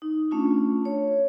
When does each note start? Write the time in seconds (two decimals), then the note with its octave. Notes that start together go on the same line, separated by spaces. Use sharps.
0.02 D#4
0.31 A3 C#4 D4 F4
0.85 C#5